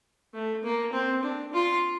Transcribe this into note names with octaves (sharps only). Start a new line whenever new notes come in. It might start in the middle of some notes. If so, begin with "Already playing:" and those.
A3
A#3
C4
D4
F4